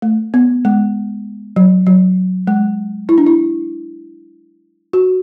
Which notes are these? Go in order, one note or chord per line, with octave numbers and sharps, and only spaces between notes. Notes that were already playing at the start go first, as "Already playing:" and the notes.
A3
B3
G#3
F#3
F#3
G#3
E4
D4
E4
F#4